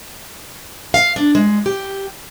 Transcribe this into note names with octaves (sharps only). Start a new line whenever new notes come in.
F5
D4
G#3
G4